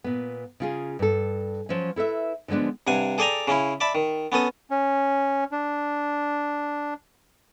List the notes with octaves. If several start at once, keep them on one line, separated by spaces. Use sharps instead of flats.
A#2 B3
C#3 F4 G#4
G2 A4
F3 F#3 C#4
E4 A4 B4 E5
D3 F3 G#3 B3 D4
G2 C3 F#5 G#5
G#4 A4 D5 G5 G#5 A#5
C#3 C#4 E4
D5 E5 A5 B5
D#3
B3 C#4 A4 D#6
C#4
D4